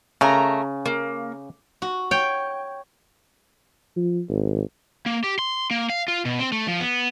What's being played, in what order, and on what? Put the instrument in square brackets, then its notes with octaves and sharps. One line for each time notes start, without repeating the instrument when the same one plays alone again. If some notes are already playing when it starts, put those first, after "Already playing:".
[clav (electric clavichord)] C#3 [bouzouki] A3 A#4 A#5
[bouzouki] A#3
[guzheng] F#4
C#5 G5
[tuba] F3
G#1
[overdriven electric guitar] A#3
G4
C6
A#3
F5
F4
B2
C4
A3
F3
B3